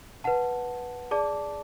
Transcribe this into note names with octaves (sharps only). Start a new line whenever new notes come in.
B4 F#5 A5
G#4 D5 A5 D6